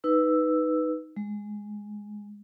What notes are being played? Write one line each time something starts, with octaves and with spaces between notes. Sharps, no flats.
D#4 B4 E6
G#3